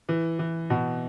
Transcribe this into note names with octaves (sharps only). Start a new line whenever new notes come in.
E3
E3
B2